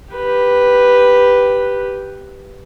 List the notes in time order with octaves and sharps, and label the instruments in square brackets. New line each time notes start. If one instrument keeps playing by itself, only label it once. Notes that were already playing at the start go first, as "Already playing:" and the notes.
[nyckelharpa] G4 B4